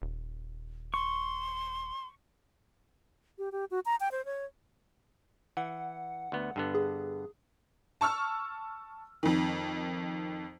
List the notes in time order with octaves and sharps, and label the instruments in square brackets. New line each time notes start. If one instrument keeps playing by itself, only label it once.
[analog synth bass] D#1
[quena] C6 [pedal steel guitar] C#6
[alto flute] G4
G4
F#4
A#5
G5
C5
C#5
[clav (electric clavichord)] E3 [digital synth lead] F#5
[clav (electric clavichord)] D2 B3
G2 D3 B3
[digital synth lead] G#4
[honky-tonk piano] A5 C#6 E6 F6
F2 D#3